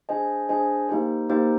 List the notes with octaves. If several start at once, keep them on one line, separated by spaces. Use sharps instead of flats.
D4 G#4 C5 D#5 G#5
D4 G#4 C5 D#5 G#5
A#3 D#4 G4 C5
A#3 D#4 G4 C5